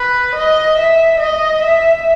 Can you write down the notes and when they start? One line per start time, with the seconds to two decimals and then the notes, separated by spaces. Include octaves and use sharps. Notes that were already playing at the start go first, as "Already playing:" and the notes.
Already playing: B4
0.36 D#5
0.78 E5
1.20 D#5
1.63 E5